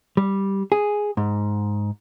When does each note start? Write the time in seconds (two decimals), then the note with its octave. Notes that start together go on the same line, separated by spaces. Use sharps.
0.17 G3
0.72 G#4
1.17 G#2